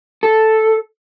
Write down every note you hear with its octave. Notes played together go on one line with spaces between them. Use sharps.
A4